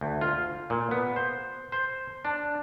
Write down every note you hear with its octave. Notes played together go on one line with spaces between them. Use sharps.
D2
F4
A#2
B3
C5
C5
D4